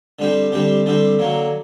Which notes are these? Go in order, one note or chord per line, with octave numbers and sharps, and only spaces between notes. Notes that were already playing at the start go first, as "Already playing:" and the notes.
D3 G3 C4 G4
D3 G3 C4 G4
D3 G3 C4 G4
D3 F#3 A#3